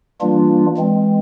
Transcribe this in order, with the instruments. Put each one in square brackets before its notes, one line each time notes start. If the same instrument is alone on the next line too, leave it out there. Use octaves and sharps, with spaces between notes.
[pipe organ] E3 G3 A#3 D4 F4
E3 G#3 C4